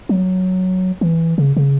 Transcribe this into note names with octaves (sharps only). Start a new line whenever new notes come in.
F#3
E3
C#3
C#3